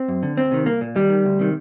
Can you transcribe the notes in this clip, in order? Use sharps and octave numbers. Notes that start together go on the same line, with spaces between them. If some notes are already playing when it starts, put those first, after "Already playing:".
Already playing: C4
F#2
D3
D2 C4
C3 D#3
C2 A#3
A#2
D#2 G3
D#3
D2
C3 D#3